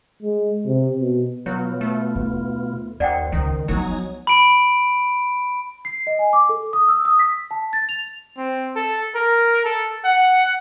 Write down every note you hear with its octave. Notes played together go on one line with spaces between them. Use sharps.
G#3
C3
B2
B2 F#3 B3 F4 C#5
A3
D#2
D#2 C5 D5 F#5 G5
C#2 D#3
F3 F#3 B3 D#4 G#5 A#5
B5 D7
C7
D#5
G#5
D6
A4
D#6
E6
D#6
B6
A5
A6
F7
C4
A4
A#4
A4
F#5